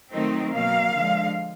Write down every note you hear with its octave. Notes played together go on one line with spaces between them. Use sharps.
D#3 F#3 A3 C4 D#4
B2 F#3 A#3 F5
D3 F3 G#3